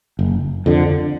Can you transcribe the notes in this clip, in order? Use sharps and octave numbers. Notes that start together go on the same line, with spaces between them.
F#1
F2 D3